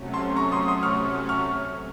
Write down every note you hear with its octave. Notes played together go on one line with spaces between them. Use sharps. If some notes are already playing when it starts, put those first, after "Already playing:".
Already playing: C3 F#3 A3 C#4
A5 C6
A#5 C#6
C6 D#6
C6 D#6
C#6 F6
C#6 F6